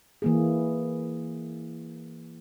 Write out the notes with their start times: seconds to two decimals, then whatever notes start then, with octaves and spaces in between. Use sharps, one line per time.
0.22 E3 A#3 G#4